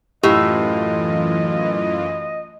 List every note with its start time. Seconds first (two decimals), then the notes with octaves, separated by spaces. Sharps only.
0.23 F#2 A2 E3 F4 G4 D#5